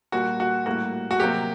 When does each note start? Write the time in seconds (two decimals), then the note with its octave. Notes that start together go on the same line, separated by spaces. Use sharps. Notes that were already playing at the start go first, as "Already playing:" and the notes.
0.12 A#2 G3 A#3 F#4
0.40 F#4
0.66 A2 G3 A#3 F#4
1.11 F#4
1.20 C3 F#3 A#3 G4